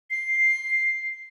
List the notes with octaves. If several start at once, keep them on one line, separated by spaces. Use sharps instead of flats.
C7